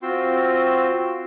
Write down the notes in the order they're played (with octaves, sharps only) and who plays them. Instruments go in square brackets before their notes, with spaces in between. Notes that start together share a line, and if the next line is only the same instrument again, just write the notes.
[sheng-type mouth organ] C4 F4 F#4 G5 C6 E6